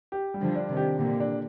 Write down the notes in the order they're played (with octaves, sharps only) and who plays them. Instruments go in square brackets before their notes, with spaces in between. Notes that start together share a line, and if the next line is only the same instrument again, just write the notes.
[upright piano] G4
G3
[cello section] D3 F3
[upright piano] D4
[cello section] C3 D#3
[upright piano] G4
[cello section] A#2 D3 [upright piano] G4
[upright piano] D4